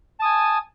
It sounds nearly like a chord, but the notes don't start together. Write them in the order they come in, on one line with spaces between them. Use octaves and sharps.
A5 D#6 G#5